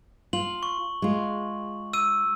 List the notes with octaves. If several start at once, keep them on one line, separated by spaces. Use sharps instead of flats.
F4 F#7
C#6
G#3 F4
E6 D#7